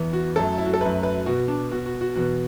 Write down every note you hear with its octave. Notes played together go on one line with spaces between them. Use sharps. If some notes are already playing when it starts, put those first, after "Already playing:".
Already playing: E2 E3 B3
F#4
F#2 F#3 A3 A4
E4
F#4
A4
F#2 F#3 A3 B4
B4
B2 B3 F#4
D4
B2 B3 F#4
F#4
F#4
E2 B2 B3 F#4